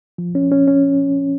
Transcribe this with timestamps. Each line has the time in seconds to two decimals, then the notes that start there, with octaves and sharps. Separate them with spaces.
0.18 F3
0.35 C#4
0.52 C#4
0.67 C#4